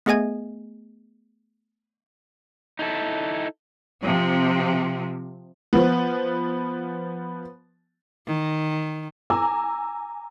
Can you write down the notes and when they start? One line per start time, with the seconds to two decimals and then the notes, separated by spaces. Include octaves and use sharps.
0.06 A3 B3 G#4 D#5 G#5 G#6
2.79 D#4 E4 A4
4.03 C3 F3
5.73 F3 B3
8.27 D#3
9.30 G#5 A#5 D6 E6